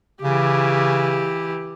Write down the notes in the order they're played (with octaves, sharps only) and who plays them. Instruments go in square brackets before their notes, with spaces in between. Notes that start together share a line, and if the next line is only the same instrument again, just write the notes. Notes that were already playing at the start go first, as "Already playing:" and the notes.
[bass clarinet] C#3 [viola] E3 G4